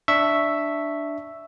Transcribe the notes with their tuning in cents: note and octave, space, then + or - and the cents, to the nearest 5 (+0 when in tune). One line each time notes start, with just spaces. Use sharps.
D4 +0 E5 +0 C#6 +0